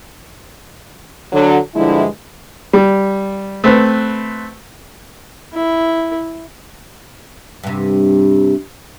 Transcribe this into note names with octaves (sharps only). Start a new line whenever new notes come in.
D3 F#3
G2 D3 F3 G#3 E4
G3
A3 C4 B4
E4
G2 C3